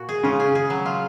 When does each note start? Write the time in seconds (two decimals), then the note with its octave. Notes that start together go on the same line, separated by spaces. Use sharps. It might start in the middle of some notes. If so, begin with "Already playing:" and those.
Already playing: A#2 F#4
0.09 G#4
0.23 C#3 F4
0.40 G#4
0.55 G#4
0.70 F#3
0.86 F4